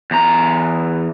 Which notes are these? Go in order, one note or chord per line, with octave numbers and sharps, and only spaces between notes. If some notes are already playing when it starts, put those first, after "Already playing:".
E2 A#5